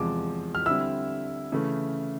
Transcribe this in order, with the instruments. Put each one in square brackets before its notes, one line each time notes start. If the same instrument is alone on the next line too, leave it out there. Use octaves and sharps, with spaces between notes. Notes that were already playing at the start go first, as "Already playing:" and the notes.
Already playing: [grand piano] E2 C3 F3 G#3 D6
F6
D3 G3 C4 E4 E6
C#3 E3 A3